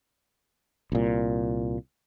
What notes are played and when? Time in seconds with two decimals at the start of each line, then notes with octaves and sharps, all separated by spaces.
0.92 C2 A#2